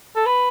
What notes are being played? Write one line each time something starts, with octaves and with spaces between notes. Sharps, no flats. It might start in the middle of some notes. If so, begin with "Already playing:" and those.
A4
B4